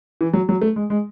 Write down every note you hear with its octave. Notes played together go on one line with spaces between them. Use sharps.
E3
F#3
F#3
A3
G#3
G#3